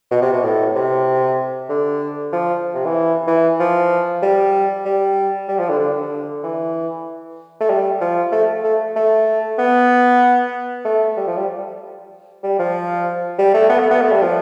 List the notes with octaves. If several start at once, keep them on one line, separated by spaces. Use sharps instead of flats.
B2
C3
B2
A2
C3
D3
F3
C3
E3
E3
F3
G3
G3
G3
F3
D3
D3
E3
A3
G3
F3
A3
A3
A3
B3
A3
G3
F3
G3
G3
F3
G3
A3
B3
A3
B3
A3
G3
F3